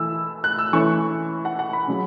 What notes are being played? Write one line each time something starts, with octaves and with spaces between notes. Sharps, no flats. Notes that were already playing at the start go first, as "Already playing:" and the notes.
Already playing: E3 A3 E4 E6
F#6
E6
E3 A3 C#4 E4 C#6
F#5
F#5
B5
C#3 F#3